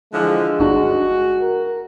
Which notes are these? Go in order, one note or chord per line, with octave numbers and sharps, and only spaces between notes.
D3 E3 F3 G#3
G1 D4 F#4
A#4